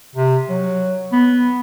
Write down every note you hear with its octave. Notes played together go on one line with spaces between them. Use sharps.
C3
F#3
B3